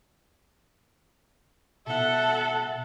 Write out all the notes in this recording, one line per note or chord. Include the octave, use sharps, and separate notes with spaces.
B2 A4 E5 F#5